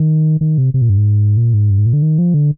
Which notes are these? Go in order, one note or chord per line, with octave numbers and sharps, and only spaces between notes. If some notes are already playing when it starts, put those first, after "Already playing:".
Already playing: D#3
D#3
C3
C3
A#2
G2
G#2
A#2
G#2
G2
G#2
A#2
D3
D#3
F3
D3